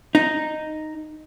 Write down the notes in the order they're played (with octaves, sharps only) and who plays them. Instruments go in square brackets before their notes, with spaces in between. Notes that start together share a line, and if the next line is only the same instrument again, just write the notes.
[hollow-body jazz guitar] D#4